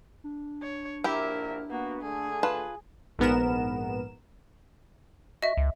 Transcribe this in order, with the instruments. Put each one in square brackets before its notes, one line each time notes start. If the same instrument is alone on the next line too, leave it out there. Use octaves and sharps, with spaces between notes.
[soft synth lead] D4
[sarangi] C#5
[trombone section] A#1 A#4 [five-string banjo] E4 G4 [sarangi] E5
[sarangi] A#3 [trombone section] B3 F#4
[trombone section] D3 A3 [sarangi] G#4
[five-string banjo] F4 B4 A5
[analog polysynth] A#1 G#2 B3 A#4 E7
[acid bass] F#4 [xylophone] D#5 E5
[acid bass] C#2